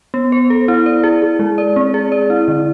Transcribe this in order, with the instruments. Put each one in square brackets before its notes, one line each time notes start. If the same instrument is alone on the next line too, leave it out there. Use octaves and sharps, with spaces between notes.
[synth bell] B3
C5
A4
E4
D5
G#4
G#4
G#3
D5
C4
G#4
D5
E4
D3